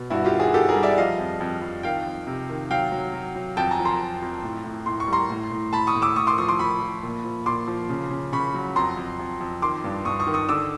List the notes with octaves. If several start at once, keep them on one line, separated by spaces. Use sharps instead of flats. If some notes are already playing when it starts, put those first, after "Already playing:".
Already playing: B2
G2 E4 F#4
F4 G4
D#3
F#4 G#4
D#3 G4 A4
G#4 A#4
G3
D5 E5
F3 D#5 F5
F2
F2
F2
D#3 F5 G5
F2
C3
D#3
F#3 F5 G5
F#3
F#3
F#3
F2 G5 A5
G#5 A#5
F3
A#5 C6
F2
F2
A2
A2
A2 C6
C#6
G3 A#5 C6
A2
A2
A2 A5 B5
C#6 D#6
A2
D6 E6
A2 C#6 D#6
C6 D6
F3 C#6 D#6
C6 D6
F3 B5 C#6
F3
A#2
F3
A#2 C6 D6
F3
C#3
C#3
C#3 B5 C#6
F#3
F2 A#5 C6
F2
F2
F2
D#3 C6 D6
G2
G2 C#6 D#6
C#6 D#6
D#3
C#6 D#6
D3 D6 E6